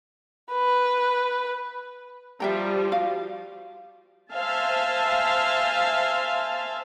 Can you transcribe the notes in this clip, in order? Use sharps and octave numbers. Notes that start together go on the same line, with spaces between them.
B4
F3 G3 E5 G5 A#5
F#4 F5
C5 E5 F5 G#5 A5